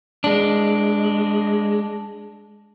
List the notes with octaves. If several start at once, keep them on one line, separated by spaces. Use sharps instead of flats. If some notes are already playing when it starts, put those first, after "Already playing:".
G#3 D4